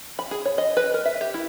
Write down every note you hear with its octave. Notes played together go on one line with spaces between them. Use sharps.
B5
G#4
C#5
D#5
B4
A#4
E5
G4
E4